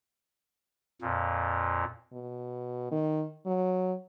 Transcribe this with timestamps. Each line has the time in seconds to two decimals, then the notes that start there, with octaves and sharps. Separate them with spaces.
1.02 F2 A#2
2.13 B2
2.91 D#3
3.46 F#3